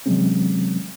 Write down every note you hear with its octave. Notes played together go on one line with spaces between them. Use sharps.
C3 E3 F#3 G#3 C4 C#4